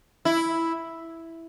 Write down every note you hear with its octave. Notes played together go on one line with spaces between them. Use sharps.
E4